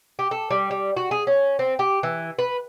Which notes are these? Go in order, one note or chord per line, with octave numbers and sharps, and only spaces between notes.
G4
A4
G3
G3
F#4
G#4
C#4
C4
G4
E3
B4